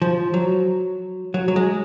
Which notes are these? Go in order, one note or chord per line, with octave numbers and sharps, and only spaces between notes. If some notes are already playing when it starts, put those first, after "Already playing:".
F3
F#3
F#3
F#3
G#3